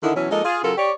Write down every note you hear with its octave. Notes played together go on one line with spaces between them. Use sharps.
D3 D#3 E4
B2 E3 F#3 C#4
F3 G#3 A#3 D#4 A4 D#5
F4 G#4
C#3 F#3 F4 A4 A#4
G4 C#5 D5